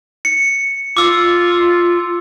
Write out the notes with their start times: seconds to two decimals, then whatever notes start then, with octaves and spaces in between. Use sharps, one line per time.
0.25 C#7
0.97 F4 D6 E6